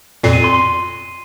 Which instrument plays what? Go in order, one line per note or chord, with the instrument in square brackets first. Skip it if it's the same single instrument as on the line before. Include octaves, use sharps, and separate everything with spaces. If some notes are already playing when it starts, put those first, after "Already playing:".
[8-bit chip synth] F2 A#2 [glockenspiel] C7
[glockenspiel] D#7
C6
C6